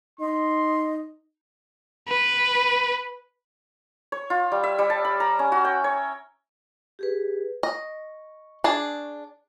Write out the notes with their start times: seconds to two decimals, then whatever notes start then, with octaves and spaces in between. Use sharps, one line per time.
0.20 D#4 D#5 C6
2.08 B4
4.12 C#5
4.30 F4
4.52 G3
4.63 E5
4.79 G3
4.90 A5
5.05 B5
5.20 A#5
5.39 C#4
5.52 F#4
5.65 G5
5.84 C#5
6.99 G4 G#4 B4
7.63 D#5 C#6
8.64 D4 G#4 A5